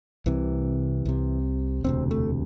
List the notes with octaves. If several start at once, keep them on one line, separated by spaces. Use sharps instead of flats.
C2 C3 E3
C2 C3
E1 D2 C3 C4
A3